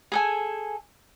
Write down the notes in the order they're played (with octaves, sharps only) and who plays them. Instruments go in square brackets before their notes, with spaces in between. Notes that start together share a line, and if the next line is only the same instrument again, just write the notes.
[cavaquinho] G#4 A4 G#5